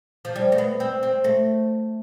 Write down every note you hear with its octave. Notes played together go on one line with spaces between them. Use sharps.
F3
G3
A3
B3
C4
C4
A3